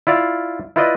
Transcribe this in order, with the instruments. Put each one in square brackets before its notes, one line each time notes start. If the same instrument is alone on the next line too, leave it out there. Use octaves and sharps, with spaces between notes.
[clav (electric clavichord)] E4 F4 D5 F5
E4 F4 B4 D5 D#5